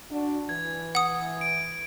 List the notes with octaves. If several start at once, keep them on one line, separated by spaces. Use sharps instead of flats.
D4 F#4
E3 G#6
F#5 D#6
D7